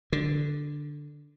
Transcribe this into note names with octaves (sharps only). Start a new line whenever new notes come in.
D3